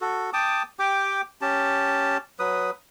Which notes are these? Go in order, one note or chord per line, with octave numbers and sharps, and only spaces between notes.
F#4 A4
G5 A5 D6 D#6
G4 G5 D6
C#4 G4 A5
F#3 B4 D#6